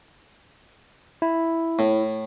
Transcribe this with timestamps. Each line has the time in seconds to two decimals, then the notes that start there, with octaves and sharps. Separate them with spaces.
1.22 E4
1.79 A2